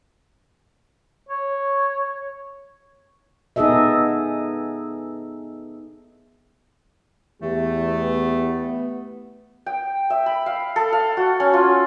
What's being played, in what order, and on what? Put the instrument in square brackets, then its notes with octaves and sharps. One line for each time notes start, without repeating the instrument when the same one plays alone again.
[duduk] C#5
[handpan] B3 D#4 G#4 A4 D#5 E5
[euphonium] E2 [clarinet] A3 [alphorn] G4
[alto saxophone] B3
[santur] G5
E5
B5
F5
A4
F5
F#4
C#4
F4